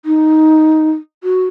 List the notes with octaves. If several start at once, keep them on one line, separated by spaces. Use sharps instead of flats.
D#4
F#4